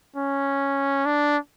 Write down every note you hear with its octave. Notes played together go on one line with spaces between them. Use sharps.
C#4
D4